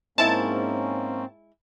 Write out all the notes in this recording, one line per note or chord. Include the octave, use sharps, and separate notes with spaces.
G#2 G#3 A#3 C4 C#4 E4 A5